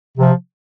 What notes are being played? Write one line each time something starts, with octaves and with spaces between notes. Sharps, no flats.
C3 F3